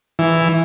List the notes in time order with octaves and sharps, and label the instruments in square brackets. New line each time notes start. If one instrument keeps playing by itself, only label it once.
[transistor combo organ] E3